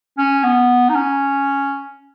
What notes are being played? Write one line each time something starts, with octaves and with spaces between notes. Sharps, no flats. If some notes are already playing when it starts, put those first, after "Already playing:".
C#4
B3
D#4
C#4